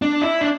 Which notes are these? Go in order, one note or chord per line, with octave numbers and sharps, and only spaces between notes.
D4
E4
D4